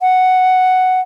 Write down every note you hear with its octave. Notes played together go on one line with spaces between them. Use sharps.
F#5